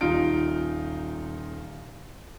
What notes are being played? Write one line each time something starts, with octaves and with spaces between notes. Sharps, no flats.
D#1 D#4 F4 D7